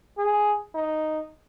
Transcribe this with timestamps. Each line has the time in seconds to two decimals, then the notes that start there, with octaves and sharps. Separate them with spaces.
0.18 G#4
0.75 D#4